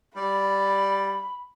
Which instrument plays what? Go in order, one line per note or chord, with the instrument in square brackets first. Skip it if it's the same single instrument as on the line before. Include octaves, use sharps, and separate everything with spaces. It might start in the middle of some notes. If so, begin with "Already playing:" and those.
[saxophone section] G3 D5 [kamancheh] B5